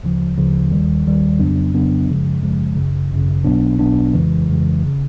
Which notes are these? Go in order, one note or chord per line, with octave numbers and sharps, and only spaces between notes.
D2 C#3 F3
D2 C#3 F3
D#2 D#3 G3
D#2 D#3 G3
F2 C#3 F#3 B3 D4
F2 C#3 F#3 B3 D4
G1 F#2 C#3 F3 G#3
G1 F#2 C#3 F3 G#3
G#1 F#2 C#3
G#1 F#2 C#3
B1 B2 F#3 B3 D4
B1 B2 F#3 B3 D4
F2 C#3 E3 G#3
F2 C#3 E3 G#3
G#1 C#3